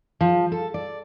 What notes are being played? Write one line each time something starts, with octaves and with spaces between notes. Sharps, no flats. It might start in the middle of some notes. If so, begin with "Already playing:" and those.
F3
A4
D5